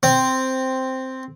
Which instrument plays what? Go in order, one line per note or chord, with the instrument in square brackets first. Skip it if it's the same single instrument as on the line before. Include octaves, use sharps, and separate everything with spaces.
[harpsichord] C4